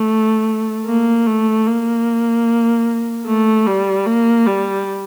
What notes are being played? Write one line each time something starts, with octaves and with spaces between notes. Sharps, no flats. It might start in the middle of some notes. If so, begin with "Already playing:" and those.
Already playing: A3
A#3
A3
A#3
A3
G3
A#3
G3